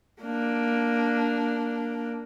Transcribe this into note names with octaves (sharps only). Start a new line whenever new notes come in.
A#3 D4